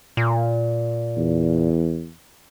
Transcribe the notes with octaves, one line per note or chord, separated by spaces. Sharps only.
A#2
E2